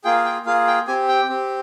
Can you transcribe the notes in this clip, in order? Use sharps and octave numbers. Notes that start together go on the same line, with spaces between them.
A#3 F4 G#4 G5
G5
A#3 F4 G#4 F5
G5
C4 G4 G#5
G5
C4 G4